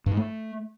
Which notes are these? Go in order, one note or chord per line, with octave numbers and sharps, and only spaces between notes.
G2
G#2
A3